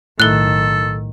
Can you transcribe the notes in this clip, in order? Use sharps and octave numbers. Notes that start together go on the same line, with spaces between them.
B1 A2 D#3 A4 F#6 G7